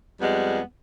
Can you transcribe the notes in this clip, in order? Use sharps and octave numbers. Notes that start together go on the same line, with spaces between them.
F2 G3 G#3 B3